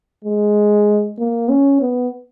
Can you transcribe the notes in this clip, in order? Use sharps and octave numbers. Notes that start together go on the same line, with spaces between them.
G#3
A#3
C#4
B3